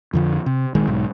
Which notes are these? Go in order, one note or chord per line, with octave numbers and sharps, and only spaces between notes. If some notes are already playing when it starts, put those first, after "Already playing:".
F2 D3 F3
C3
A#1 D#3 G#3
B1 G#2